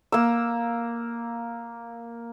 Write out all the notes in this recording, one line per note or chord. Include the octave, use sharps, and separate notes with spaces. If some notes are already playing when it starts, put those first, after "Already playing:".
A#3 E6